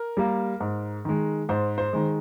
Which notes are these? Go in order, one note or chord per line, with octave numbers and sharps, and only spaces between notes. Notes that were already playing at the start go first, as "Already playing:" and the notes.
Already playing: A#4
G3 A#3
G#2
D#3 G#3
G#2 C5
C5
D#3 G#3